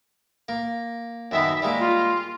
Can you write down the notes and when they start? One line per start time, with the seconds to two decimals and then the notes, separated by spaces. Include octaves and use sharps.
0.48 A#3
1.31 F#2 D#3 B3 E5
1.62 G3 G#3 A#3
1.79 F4